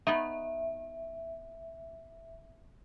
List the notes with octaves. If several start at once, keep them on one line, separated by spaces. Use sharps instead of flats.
B3 D#4 E5